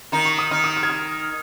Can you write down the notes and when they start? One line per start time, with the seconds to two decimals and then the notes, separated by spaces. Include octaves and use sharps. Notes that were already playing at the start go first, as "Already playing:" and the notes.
0.12 D#3 D#4 A#5
0.25 C#6
0.39 D#6
0.50 D#3 D#4 F6
0.64 D#6
0.76 F6
0.83 G#6
0.90 F6